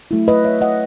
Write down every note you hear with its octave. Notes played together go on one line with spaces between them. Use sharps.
F#3 A3 E4
B4 D#5
C#5 E5
D#5 F#5